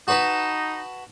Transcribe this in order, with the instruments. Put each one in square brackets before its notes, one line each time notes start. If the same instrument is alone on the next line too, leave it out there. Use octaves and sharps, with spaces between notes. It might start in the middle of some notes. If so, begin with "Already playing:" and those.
[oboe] D#4 [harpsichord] F#4 B4 A5